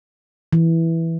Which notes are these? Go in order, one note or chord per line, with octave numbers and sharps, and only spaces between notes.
E3